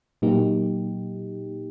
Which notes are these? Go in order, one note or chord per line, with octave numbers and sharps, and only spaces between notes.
A#2 F#3 A#3 D#4 G4